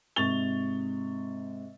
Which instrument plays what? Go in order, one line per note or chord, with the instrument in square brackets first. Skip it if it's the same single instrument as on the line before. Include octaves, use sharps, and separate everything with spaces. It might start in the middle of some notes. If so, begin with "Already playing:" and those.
[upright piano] G#2 C3 C#6 A6 F7 G7